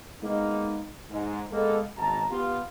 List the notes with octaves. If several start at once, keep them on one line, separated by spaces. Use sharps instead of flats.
G#3 A#3 B3 D#4
G#2
G#3 A#3 B3 A4
G#1 F#2 B2 A5 A#5
B3 F4 G4